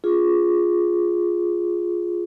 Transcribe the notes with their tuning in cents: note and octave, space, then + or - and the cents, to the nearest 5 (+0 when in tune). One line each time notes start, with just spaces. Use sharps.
F4 +0 G#4 +5